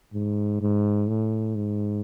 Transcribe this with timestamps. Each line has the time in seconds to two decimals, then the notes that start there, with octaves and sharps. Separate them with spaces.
0.14 G#2
0.61 G#2
1.08 A2
1.56 G#2